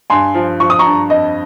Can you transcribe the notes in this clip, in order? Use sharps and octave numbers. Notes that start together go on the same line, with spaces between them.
G2 G#5 C6
F3
F3 C#6
D#6
A#5 C#6
G2
F2 D#5